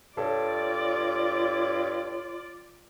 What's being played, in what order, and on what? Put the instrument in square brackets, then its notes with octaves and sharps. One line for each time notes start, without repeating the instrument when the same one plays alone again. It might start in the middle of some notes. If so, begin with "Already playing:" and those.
[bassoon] G2 [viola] F4 D5 [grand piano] A4 [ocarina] C#5